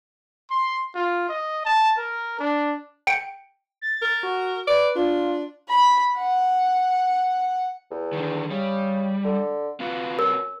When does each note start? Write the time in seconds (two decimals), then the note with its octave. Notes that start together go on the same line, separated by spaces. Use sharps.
0.50 C6
0.95 F4
1.29 D#5
1.65 A5
1.98 A#4
2.39 D4
3.07 G5 C#7 D7
3.81 A6
4.02 A#4
4.23 F#4
4.67 B4 D5
4.96 D4 F4
5.69 B5
6.18 F#5
7.91 E2
8.13 D3 D#3
8.51 C#3 G3
9.25 D3
9.80 C4 F4 F#4 B4
10.19 C#4 A#4